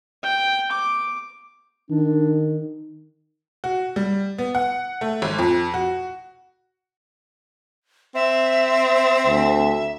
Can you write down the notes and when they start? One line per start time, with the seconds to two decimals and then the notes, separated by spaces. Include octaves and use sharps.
0.23 G5
0.71 D6
1.91 D#3 D4
3.64 F#4
3.96 G3
4.38 B3
4.55 F#5
5.01 A3
5.22 G#1
5.38 F2
5.74 F#4
8.15 C4 E5
9.27 D2